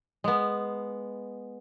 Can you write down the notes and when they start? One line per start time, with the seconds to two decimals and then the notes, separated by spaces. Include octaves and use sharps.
0.24 G#3 B3